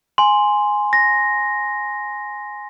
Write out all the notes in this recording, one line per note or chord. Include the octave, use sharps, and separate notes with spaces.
G#5 C6
A#6